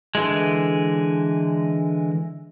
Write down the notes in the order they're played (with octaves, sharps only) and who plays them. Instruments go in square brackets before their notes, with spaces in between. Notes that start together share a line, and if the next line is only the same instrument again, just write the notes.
[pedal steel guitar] D3 E3 G#3